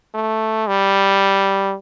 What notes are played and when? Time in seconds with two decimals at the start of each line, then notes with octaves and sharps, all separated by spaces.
0.14 A3
0.67 G3